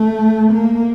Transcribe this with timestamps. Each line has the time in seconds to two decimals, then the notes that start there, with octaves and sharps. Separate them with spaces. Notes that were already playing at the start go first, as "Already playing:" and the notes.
Already playing: A3
0.52 A#3